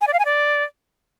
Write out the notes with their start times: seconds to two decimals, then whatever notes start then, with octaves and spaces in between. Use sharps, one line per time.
0.01 G#5
0.07 D5
0.13 F5
0.19 G#5
0.25 D5